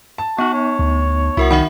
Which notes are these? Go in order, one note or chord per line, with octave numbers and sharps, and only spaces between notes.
A5
B3 D#4 F#4
C#5
D2
C2 E4 F#4 A#4 F#5
D#3 E5 F#5 B5